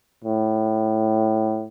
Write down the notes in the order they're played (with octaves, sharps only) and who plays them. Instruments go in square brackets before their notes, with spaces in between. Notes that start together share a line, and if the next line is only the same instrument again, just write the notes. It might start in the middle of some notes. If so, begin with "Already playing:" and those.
[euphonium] A2